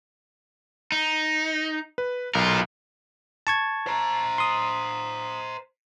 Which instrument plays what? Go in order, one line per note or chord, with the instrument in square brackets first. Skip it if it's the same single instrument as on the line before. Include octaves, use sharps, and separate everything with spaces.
[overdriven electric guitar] D#4
[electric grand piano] B4
[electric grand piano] B1 [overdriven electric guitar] F4 A#4
[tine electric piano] A5 C#6 G#6
[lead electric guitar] C5 A#5
[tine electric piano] C6 D#6